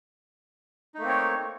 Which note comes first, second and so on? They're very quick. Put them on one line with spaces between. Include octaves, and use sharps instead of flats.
D#4 A3 A#3 C4 C#5